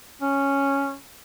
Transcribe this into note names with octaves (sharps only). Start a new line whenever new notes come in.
C#4